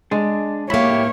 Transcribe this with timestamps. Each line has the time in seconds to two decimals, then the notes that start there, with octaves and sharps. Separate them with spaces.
0.11 G#3 D4
0.70 A2 A#3 G4 C#5 E5 B5